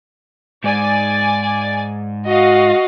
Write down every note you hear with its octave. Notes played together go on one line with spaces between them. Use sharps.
G#2 D5 G#5
F#4 D#5 F5